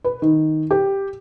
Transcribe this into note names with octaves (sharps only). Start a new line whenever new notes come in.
B4
D#3
G4